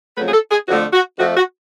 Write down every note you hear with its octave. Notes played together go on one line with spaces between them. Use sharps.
F2 C#3 F#3 A3 B4
G#4
A4
G#4
F2 D3 F3 A3 F#4
F#4
F2 F3 A3 F#4
F#4